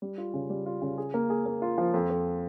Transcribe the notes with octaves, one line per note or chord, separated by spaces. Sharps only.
G3
F4
C#3
G3
F4
C#3
G#4
A#3
G#4
A#3
F4
F3
F2
F2